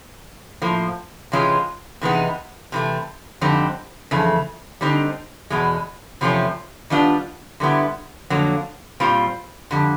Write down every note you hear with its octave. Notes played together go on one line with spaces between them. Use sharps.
A2 F3 A#3
C3 E3 G#3 C#4 F4
C3 E3 G#3 B3 D#4
C3 E3 A3
F2 D3 G3 C4 D#4
F2 C#3 E3 A3
D3 G3 C4 D#4
E2 B2 G#3
E2 C3 F3 A3 C#4
D#3 G3 B3 D4 F4
D3 G3 B3 E4
F2 D3 F#3 A#3
A#2 G3 C4 F4
F2 D3 G3